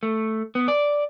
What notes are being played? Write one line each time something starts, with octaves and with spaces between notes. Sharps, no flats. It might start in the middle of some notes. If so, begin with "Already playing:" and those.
A3
B3
D5